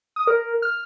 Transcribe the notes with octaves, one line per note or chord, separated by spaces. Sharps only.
D#6
A#4
F6